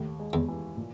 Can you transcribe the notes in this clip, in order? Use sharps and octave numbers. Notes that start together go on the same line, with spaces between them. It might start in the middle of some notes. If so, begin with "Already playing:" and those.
Already playing: D#2 A2
G#3
E2
E3
A#2